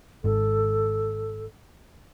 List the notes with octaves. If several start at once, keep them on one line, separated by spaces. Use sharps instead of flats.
G#1 G#2 A4